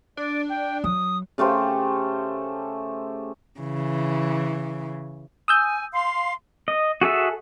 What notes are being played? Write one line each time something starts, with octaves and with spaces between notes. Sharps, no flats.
D4 D5
G5
F#3 D#6
C#3 A3 G4 C5
C#3 E3
G#5 D#6 E6 G6
F5 C6
D#5
F#4 G#4 A4 E5